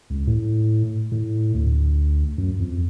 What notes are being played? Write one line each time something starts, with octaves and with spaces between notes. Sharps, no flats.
C#2
A2
A2
D2
F#2
F2